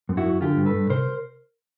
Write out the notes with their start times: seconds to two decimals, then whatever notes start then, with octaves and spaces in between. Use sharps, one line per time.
0.09 F#2
0.17 E4 F#4
0.26 F#2
0.41 D3 F4 G4
0.57 G2
0.66 A4 B4
0.74 G2
0.90 C3 A#4 C5